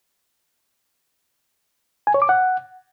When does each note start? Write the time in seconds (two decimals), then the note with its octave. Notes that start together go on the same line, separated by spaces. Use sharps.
2.07 G#5
2.14 C#5
2.22 D6
2.29 F#5